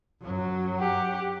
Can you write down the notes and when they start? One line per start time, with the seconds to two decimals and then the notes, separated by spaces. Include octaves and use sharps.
0.21 F#2 F#3
0.79 G4 F#5